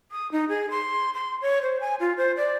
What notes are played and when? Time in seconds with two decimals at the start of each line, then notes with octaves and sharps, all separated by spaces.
0.11 D#6
0.32 D#4
0.49 G#4
0.70 C6
1.14 C6
1.42 C#5
1.62 C5
1.80 G#5
2.00 F4
2.17 C5
2.37 D5